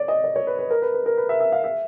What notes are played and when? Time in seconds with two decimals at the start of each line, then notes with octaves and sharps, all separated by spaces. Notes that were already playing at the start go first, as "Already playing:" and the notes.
Already playing: C#5 D5
0.08 D#5
0.24 D5
0.36 C#5
0.47 B4
0.59 B4
0.70 A#4
0.82 B4
0.94 B4
1.06 A#4
1.18 B4
1.29 E5
1.40 E5
1.52 F5
1.64 E5